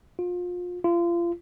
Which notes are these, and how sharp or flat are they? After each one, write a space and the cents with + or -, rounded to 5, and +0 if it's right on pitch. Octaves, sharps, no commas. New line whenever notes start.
F4 +30
F4 -30